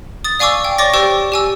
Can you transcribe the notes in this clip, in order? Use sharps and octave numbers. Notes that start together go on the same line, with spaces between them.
D#6 A6
D5 F5 G#5 C#6 D6 E6
G5
C#5 D5 C#6 D6 A6 A#6
G4 C5 D5 G5 C#6 E6
G4 G#5 E6